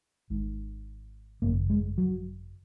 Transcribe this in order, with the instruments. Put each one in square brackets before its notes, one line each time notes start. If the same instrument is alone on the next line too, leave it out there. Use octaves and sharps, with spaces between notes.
[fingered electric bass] G#1 G#2
G#1 F#2 C#3 A#3
G#3
F#3